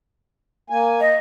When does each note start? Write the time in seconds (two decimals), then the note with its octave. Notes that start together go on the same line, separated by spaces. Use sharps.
0.70 A#3 G#5
1.01 D#5